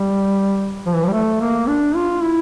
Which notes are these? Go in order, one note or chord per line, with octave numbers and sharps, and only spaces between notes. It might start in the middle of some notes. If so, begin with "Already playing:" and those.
Already playing: G3
F3
E3
F3
G3
A3
A#3
D4
F4
E4